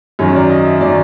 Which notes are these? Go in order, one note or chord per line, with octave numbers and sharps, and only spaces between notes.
F#2 D#3 F#3 C#5
D5
D#5
E5
D#3 F#3 D5